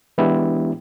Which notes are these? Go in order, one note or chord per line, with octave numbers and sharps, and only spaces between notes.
E3 G#3 B3 D4 E4 G4